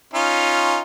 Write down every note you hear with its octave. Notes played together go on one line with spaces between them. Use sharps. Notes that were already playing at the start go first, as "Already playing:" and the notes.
C#4 D#4 F4